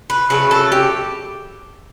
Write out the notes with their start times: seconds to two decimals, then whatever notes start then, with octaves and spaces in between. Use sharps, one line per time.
0.10 B4
0.30 C#3 F#3 A3 B4
0.51 A4
0.72 G4